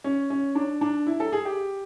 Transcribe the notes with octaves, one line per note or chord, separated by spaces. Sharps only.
C#4
C#4
D4
D4
E4
A4
G#4
G4